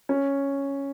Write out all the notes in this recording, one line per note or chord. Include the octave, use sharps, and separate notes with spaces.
C#4